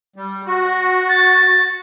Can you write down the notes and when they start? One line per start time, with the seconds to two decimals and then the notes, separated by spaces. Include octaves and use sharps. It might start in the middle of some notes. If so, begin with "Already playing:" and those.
0.16 G3
0.46 F#4
1.09 A6